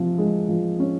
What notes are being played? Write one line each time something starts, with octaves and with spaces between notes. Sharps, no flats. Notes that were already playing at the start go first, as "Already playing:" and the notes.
Already playing: C3 F3
G#3
F3
C#4